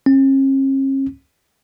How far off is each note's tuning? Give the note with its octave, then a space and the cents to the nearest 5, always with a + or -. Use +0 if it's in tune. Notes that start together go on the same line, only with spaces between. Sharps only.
C#4 -45